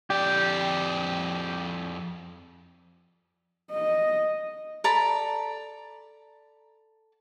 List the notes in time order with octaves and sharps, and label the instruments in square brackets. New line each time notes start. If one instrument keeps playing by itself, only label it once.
[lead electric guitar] F2 D5 [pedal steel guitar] G4
[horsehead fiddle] D#5
[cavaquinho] A4 D5 A#5 B5